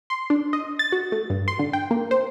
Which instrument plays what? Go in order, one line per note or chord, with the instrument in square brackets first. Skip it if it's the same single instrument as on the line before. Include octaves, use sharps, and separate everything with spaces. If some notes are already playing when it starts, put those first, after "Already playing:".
[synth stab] C6
D4
D#5
A6
F#4
A3
G2
C6
D3
G5
A#3
C5